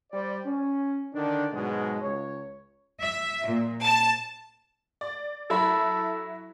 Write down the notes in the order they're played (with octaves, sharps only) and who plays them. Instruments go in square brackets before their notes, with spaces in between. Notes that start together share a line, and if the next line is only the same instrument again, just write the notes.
[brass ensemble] G3 C5 D5
C#4
D3 D#3 D4
G#2 B2 F#3 G#3
C#2 C#5
[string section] E5
A#2
A5
[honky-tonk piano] D5
[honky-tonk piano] F#3 E4 B5 [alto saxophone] A4